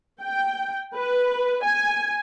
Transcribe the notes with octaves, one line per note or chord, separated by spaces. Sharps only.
G5
B4
G#5